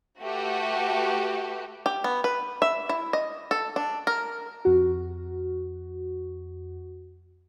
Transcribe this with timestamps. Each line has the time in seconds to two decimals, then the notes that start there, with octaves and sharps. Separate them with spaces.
0.21 A3 F#4 G4 B4
1.86 G4
2.04 B3
2.24 B4
2.62 E5
2.89 E4
3.13 D#5
3.51 A4
3.76 D4
4.07 A#4
4.65 F2 F#4